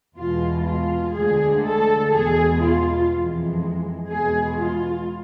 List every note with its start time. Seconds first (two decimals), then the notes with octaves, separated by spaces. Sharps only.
0.16 E2 B2 G#3 F4
0.65 F4
1.14 D2 D3 G#3 G#4
1.64 A4
2.12 E2 B2 G#3 G#4
2.62 F4
3.12 F2 E3 G#3
4.09 E2 B2 G#3 G#4
4.58 F4